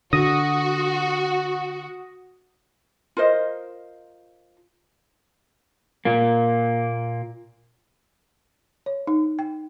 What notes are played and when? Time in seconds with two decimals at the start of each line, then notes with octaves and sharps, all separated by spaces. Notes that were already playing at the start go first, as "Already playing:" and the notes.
0.13 D3 F#4 D#6 A#6
3.17 F4 A#4 C5 D#5
6.05 A#2 A#3
8.86 C#5
9.07 D#4
9.39 G5